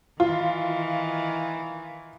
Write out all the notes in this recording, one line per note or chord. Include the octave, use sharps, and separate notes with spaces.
D#3 E3 F4